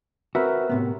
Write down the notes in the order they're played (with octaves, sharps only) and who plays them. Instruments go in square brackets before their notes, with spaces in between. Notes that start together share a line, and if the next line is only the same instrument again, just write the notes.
[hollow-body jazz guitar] C4 F#4 [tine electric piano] A#4 B4 E5
[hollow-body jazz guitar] A2 C3 B3